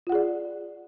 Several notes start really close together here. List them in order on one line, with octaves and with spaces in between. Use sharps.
F4 F#5 G#4 D5